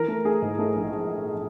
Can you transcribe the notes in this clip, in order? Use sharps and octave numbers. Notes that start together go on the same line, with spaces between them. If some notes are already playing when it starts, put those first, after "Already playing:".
Already playing: E3 A#4
A3
A3 G#4
G#2
A3
A#1